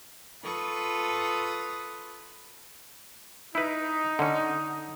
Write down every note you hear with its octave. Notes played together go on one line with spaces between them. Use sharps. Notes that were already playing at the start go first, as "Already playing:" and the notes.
F4 A4 B4 C#6 D#6
D#4 E4 B4
D3 C#4